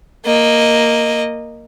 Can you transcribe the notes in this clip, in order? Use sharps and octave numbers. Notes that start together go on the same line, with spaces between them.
A#3 D#5